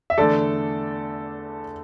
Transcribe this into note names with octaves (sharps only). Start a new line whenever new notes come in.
E5
E2 D3 A3 A4 D5